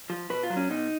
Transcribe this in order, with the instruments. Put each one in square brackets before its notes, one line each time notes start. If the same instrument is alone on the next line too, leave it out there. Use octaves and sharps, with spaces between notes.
[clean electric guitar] F3
B2 B4
F4
F#3
C#4
B2 D#4